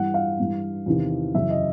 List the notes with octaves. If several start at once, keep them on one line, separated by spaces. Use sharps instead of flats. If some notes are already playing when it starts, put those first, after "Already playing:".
Already playing: G2 E3 F#5
F5
G2 E3
E2 C3 D#3
F#2 C#3 E3 E5
D#5